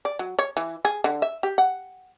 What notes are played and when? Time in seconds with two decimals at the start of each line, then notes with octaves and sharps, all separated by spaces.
0.05 D5
0.19 F#3
0.39 C#5
0.57 E3
0.85 G#4
1.04 D3
1.22 E5
1.43 G4
1.58 F#5